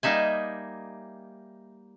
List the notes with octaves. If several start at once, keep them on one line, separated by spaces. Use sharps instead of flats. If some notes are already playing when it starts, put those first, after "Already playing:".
G3 A#3 D#4 E5 G#5